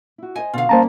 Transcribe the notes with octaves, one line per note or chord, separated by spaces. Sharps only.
E4 F#4
C5 D#5 G#5
B2 D3 F4 F5
G3 A#3 C#4 C5 A5 A#5